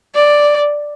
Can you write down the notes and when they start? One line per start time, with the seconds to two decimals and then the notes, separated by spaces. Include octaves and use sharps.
0.15 D5